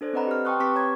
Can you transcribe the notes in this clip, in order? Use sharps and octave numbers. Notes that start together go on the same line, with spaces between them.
D4 A4 C5 D5
C4 B4 D#5 F#5 A#5 B5
G4 B4 F6
G5 A5 C6 C#6 D#6 F#6
C4 G4 B4 C#6 D6 B6
C#5 A#5 D6 G#6